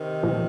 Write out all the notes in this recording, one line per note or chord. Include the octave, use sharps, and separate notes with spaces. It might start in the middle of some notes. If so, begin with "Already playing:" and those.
Already playing: C3 D#3
A#2 F3